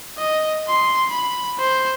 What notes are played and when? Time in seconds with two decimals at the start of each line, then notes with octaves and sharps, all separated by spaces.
0.17 D#5
0.67 C6
1.10 B5
1.58 C5